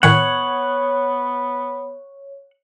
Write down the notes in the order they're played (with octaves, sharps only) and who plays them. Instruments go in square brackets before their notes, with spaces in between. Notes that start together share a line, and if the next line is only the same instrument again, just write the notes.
[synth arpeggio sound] A2 D#3 C#7 [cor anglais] B3 [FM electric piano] C#5 [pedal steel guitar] F#5